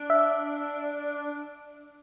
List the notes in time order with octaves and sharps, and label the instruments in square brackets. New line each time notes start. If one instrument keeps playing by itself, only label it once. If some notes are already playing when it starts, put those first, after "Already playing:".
Already playing: [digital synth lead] D4
[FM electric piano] E5